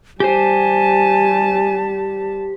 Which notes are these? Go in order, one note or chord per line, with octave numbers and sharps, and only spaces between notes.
G3 G4 C5 G#5 A5